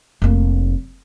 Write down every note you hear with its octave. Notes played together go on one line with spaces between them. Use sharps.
F1 A#3